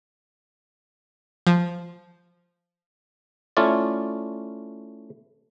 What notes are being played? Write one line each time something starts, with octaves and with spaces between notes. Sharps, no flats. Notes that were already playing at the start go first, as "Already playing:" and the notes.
F3
A3 C#4 E4 F4 D5